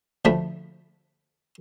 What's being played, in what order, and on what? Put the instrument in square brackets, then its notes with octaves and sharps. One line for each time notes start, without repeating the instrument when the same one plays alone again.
[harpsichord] D2 F3 A3 D4 B5